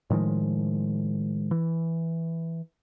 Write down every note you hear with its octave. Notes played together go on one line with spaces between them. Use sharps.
A2 D#3 F3 G#3
E3